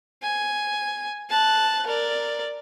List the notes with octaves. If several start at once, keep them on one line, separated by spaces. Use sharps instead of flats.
G#5
A5 F#6
A#4 D5